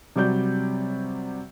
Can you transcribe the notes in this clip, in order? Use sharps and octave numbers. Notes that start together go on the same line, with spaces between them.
C3 F#3 G3 D5 G6